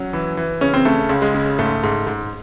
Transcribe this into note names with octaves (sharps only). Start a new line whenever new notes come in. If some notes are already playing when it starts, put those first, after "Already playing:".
Already playing: F#3 C#4
E3
E3
C#3 C#4
C4
C#3 A3
C#2
G#3
C#3
G#2 A3
G#2
G#2